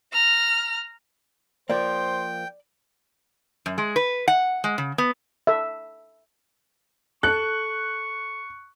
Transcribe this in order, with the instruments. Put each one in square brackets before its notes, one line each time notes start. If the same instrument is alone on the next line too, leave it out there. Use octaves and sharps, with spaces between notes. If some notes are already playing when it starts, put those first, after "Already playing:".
[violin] A#5 F6
[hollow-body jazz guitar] F3 A#3 [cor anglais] C5 [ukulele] D5 [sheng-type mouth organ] G5
[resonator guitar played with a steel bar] F#2
G#3
B4
F#5
G#3
C#3
B3
[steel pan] A4 E5
[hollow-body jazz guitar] A4 [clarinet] C#6 [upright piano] F#6